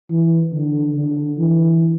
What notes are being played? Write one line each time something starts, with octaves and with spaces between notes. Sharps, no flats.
E3
D3
D3
E3